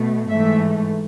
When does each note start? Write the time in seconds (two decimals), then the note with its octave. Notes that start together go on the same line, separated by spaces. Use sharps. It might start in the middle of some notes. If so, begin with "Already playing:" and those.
Already playing: B2 A3
0.29 G#2 E3 A3 E5